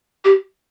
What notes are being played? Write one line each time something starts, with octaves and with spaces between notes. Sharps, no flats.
G4